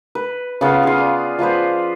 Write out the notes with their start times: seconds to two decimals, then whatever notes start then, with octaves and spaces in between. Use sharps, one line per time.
0.15 B4
0.61 C#3 B3 F4 F5
0.83 F4 G#4
0.98 D5
1.39 F3 F4 B4 C5